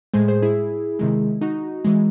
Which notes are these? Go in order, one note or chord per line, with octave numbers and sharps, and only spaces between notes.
A2 G#3 G#4 C5
G#4 C5
E4 G#4
C3 D#3 G#3
D#4 F#4
E3 G#3